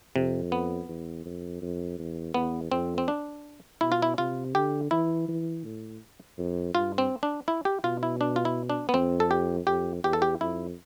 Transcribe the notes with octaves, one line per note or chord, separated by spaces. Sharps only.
F2 C3
B3
E2
F2
F2
E2
E2 B3
F2 C4
C4
D4
B2 E4
F4
E4
C3 F4
D3 G4
E3 E4
E3
A2
F2
G2 F4
C4
D4
E4
G4
B2 F4
E4
D4
F4
E4
D4
B3
F2 C4
A4
G4
F2 G4
E2 G4
A4
G4
F2 E4